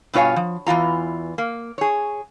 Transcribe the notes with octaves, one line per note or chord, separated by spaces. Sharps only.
G2 B2 F4 C#5 F5 G#5
F3
E2 E3 F4 A#5
A#3
G#4 C#5